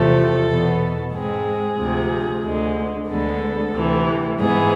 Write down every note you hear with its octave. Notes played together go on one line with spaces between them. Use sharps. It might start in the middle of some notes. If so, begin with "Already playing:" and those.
Already playing: E2 C3 F3 A3 A4
E2 B2 B3
G#2 G#3 C4 G#4
D2 C3 F3
D2 D3 G#3
D2 D3 G#3 B3 A4
D2 C3 E3
G#2 E3 B3 G#4